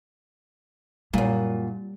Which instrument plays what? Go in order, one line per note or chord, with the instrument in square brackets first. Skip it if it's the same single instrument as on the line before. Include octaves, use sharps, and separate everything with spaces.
[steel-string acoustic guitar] F#2 A#2 [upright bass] G3